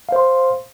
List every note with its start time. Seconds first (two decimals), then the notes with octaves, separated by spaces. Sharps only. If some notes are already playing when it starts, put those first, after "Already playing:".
0.09 F5
0.12 C5
0.16 C6